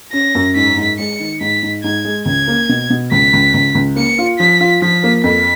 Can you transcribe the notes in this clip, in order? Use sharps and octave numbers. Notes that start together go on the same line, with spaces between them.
C#4 A#6
F#2
G#2 B6
G#2
G#3 C#7
D#3
G#2 B6
G#2
G#2 G#6
G#3
C#2 G#6
A#3
B2
B2
C#2 B6
C#2
C#2
C#2
A#3 C#7
F4
F3 B6
F4
F3 B6
A#3
F2 B6